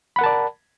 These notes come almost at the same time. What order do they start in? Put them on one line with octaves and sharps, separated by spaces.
B5 F#5 A#4 A5 D5